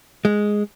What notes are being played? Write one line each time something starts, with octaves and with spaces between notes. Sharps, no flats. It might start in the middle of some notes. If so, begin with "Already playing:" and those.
G#3